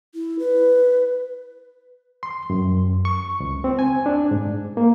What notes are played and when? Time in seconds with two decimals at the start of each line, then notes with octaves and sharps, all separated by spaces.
0.15 E4
0.39 B4
2.23 C6
2.50 F#2
3.05 C#6
3.40 C#2
3.64 C4
3.79 G#5
4.06 D4
4.31 G#2
4.77 A#3